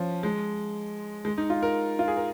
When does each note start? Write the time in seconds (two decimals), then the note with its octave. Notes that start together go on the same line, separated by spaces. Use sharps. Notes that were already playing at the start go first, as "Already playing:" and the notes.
Already playing: F3 C#4
0.23 G#3
1.25 G#3
1.38 D#4
1.50 F4
1.62 A#4
1.99 F4
2.08 G#4
2.17 A#4